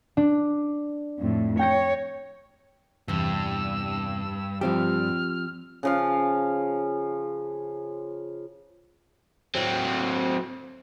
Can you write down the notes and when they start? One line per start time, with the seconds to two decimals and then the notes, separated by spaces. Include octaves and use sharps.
0.17 D4
1.19 F2 A2
1.59 C#5 G5 A#6 C#7
3.08 E2 G2 C3 E6
4.61 F3 G3 C4 G4 F6
5.83 C#3 F3 F5
9.55 F#3 C4